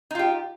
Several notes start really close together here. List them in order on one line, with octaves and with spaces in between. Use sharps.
D#4 F4 G4